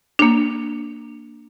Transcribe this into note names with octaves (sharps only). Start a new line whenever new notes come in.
A#3 D4